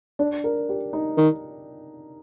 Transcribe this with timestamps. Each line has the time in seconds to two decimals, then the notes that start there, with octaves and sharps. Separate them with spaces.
0.19 D4
0.44 A#4
0.69 G4
0.93 D#4
1.17 D#3